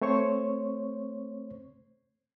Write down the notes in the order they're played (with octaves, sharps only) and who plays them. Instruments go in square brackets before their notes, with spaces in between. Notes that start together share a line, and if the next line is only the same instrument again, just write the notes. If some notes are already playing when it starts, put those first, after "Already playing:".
[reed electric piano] A3 C4 C5 C#5 C#6